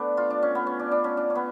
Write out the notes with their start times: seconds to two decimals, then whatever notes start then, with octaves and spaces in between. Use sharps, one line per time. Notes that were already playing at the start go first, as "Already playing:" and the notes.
Already playing: A3 B3 D4
0.17 F4
0.30 D4
0.42 C#4
0.55 B3
0.67 C#4
0.79 D4
0.91 D4
1.04 C#4
1.17 D4
1.30 C#4
1.35 B3